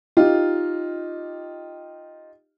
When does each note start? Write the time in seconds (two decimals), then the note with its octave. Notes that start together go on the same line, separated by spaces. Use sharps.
0.17 D#4 F4 G4